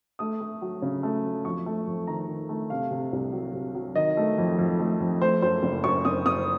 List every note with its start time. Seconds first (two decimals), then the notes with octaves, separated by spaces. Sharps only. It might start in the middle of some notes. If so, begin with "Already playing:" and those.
0.19 A3 D#6
0.41 A3
0.62 F#3
0.82 C#3
1.03 A3
1.24 F#3
1.45 F2 C#6
1.66 A3
1.87 F2
2.07 D#3 A#5
2.28 D#3
2.49 A3
2.70 C3 F5
2.91 C3
3.13 C2
3.33 F#3
3.53 C3
3.75 F#3
3.96 D#3 D#5
4.17 A3
4.38 F2
4.59 F2
4.79 A3
5.01 F2
5.21 A3 C5
5.42 F#2 C5
5.63 F#1
5.84 F#2 C#6
6.05 F#1 D#6
6.26 F#1 D#6